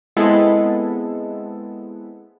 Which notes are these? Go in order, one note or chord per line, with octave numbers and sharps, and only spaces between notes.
G#3 B3 C4 E4 G#4 A4